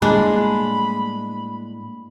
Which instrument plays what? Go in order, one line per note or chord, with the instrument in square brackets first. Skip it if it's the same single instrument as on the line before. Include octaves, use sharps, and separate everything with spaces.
[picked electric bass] A2 G3 A#3 [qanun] G#3 D4 [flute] B5